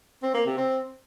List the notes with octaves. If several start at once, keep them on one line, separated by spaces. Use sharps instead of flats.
C4
A#3
C3
C4